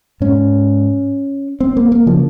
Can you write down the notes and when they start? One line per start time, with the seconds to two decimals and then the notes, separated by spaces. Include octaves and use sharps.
0.21 G#2 C#4
1.60 C4
1.77 A#3
1.92 A#3
2.06 C#3 F3